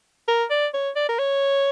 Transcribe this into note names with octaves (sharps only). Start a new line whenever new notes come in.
A#4
D5
C#5
D5
A#4
C#5